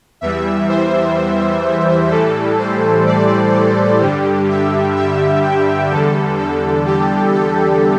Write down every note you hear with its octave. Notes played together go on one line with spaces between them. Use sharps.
E2 E3 G3 E5
C5
A2 E3 G3 A4
C5
D5
A4
G2 D3 G3 G4
E5
E5
G5
E2 D3 G3 A4
A4
G4
A4